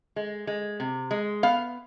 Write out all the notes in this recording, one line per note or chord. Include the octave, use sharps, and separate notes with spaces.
G#3
G#3
C3
G#3
B3 F5